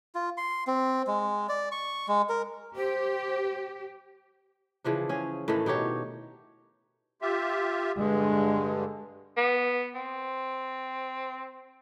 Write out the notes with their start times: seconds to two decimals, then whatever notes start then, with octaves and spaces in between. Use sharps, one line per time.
0.15 F4
0.37 C6
0.67 C4
1.07 G#3
1.49 D5
1.72 C#6
2.08 G#3
2.29 A#4
2.76 G4 C5
4.84 C#3 E3 F3 D4
5.09 C#4 G#4
5.48 A2 D#3 E3 A3
5.66 B2 D#4 G4 C#5
7.22 F4 G4 E5
7.97 G2 D3 G#3
9.37 B3
9.95 C4